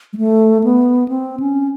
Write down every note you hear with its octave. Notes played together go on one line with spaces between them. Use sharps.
G#3
A3
B3
C4
C#4